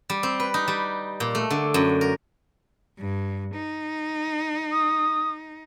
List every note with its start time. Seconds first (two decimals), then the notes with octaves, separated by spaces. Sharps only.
0.10 G3
0.23 C4
0.40 B4
0.54 D#4
0.68 G3
1.20 A#2
1.35 A3
1.50 D3
1.74 F#2
2.01 A#4
2.99 G2
3.55 D#4
4.71 D#6